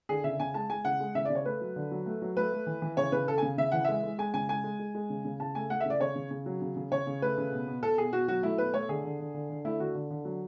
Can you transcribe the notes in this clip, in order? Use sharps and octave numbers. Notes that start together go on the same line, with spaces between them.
D3 G#4
C#3 E5
C#3 G#5
G#3 A5
G#3 G#5
C#3 F#5
G#3
C#3 E5
D5
C#3
C#5
A3 B4
F#3
D3
F#3
A3
F#3
A3 B4
A3
E3
E3
C#3 C#5
C#3 B4
C#3 A4
G#5
C#3
C#3 E5
E3 F#5
G#3 E5
G#3
G#3 G#5
C#3 G#5
G#3 G#5
G#3
G#3
G#3
C#3
C#3
C#3 A5
A3 G#5
A3 F#5
E5
C#3 D5
C#3 C#5
C#3
C#3
F#3
C#3
C#3
C#3 C#5
C#3
A3 B4
C#3
B2
B2
B2 A4
B2 G#4
B2 F#4
F#3 F#4
A3 E4
B2 B4
A3 C#5
D3 G#4
D3
D3
D3
D3
A3 E4
D3 F#4
D3
D3
F#3